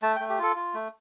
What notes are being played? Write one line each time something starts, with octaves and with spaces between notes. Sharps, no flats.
A3 A5
A3 G5
G4
F4 A4
F4
A3